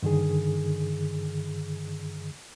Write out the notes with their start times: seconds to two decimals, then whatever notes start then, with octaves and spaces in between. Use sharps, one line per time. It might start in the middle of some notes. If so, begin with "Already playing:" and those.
0.03 G2 D3 D#3 G#4